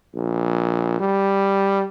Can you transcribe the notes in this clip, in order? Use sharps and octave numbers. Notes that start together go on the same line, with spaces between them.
A#1
G3